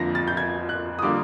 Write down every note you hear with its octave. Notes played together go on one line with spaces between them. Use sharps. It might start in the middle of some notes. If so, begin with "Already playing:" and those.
Already playing: F2 D3 F3 A#3 A#6
A6
G6
G#6
F#6
D#6
D3 G3 A#3 D6